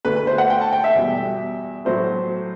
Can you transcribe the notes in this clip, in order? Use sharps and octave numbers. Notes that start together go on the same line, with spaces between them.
D2 D3 A3 B4
B4
C5
F#5
G5
A5
G5
E5
E2 B2 G3
A2 F#3 A3 C5